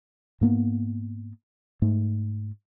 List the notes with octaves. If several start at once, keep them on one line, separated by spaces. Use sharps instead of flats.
G#2 A#3 B3
G#2 A3